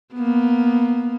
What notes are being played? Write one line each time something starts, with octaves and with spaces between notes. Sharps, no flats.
A#3 B3